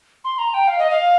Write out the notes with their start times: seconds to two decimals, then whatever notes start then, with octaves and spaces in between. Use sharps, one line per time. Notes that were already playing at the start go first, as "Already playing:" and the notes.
0.24 C6
0.38 A#5
0.53 G5
0.67 F5
0.78 D#5
0.90 F5